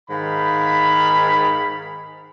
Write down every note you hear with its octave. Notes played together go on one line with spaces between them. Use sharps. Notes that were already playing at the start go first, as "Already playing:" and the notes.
G#2 D#3 F5 B5